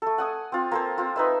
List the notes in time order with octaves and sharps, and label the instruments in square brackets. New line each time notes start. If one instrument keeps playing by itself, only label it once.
[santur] A3 A4
F#5 G#5 D#6
C4 F4
A#3 A4 C5
C4 F4
D#4 B4 E5